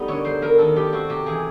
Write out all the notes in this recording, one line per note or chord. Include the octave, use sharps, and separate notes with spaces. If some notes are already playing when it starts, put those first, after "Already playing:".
Already playing: G3 A3 B3 D#4
D3 C#5
F#3 C5
B3 A#4
D#3 A4
G3 G4
C4 F#4
C3 G4
E3 G#4